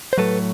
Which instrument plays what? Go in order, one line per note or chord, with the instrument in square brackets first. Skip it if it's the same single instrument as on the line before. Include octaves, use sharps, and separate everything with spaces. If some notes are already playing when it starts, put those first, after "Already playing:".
[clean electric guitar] C5
A2 F#3 A3 A4 B4